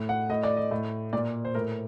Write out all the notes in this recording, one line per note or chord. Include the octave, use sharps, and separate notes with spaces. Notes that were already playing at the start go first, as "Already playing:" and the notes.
Already playing: A2
F#5
A2 D#5
D5
D#5
A2
A#2 D5
C5
A2 A#4